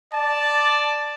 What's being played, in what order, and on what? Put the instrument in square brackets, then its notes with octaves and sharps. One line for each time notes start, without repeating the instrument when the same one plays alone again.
[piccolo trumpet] D5 [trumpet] A5